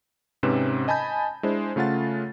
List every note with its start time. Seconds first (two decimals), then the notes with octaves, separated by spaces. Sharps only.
0.43 G#2 C3 C4 C#4 B4 E7
0.88 D#5 G#5 A5 B5 G6
1.43 G#3 D4 E4 C5
1.76 C#3 A3 F4 F#5 A6